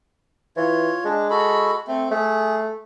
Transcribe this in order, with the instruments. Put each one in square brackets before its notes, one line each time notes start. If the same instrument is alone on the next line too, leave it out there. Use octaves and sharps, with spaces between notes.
[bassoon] E3 [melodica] F4 C#5
[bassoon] G#3 [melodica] D4
[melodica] F#4 A4 B5
A3 C4
[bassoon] A3 [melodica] G#4